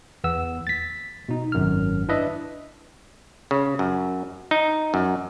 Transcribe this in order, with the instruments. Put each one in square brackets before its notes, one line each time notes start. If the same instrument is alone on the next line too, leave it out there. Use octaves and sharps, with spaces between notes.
[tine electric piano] E2 B3 E6
A6 B6
B2 D#4
G#1 F#2 F6
D4 E4 B4 D#5 E5
[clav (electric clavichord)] C#3
F#2
D#4
F#2